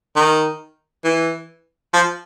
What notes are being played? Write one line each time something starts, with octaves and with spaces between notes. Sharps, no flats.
D#3
E3
F3